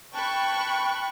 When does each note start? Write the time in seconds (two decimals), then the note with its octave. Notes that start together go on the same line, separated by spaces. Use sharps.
0.12 G5 A5 B5 C#6 F#6